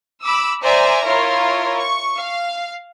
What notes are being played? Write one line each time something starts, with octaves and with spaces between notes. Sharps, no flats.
B5 D6 E6
C5 D5 E5 G#5 A#5
E4 F4 A#4 C#5
C#6
F5